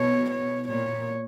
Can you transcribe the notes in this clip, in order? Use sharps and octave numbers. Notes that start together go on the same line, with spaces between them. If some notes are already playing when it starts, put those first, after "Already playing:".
Already playing: B2 C#5
C#5
A#2 C#5